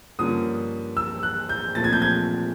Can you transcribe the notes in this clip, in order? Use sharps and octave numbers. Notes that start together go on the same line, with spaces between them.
G2 D3 F3 A#3 C#4 D#6
E6
F#6
G6
A#2 F3 A3 C4 A6
G#6
G6
G#6